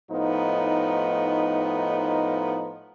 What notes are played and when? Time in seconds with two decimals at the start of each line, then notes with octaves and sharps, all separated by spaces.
0.11 A2 F3 B3 D#4